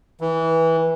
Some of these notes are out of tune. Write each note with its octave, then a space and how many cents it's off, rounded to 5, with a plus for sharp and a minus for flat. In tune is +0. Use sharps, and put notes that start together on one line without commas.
E3 -15